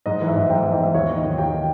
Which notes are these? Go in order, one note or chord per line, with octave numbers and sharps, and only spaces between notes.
G#2 D#5
E3
E5
G#2
G#2 G5
E3
D#5
E3 E5
D#2 C#5
D#3
D#5
D#3
D#2 G5
D#3